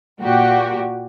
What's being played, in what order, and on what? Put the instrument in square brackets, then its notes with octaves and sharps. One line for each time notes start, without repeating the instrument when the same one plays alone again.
[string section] A#2 F#4 G4